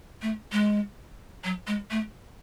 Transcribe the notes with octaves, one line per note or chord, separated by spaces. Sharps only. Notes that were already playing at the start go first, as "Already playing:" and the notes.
A3
G#3
F#3
G#3
A3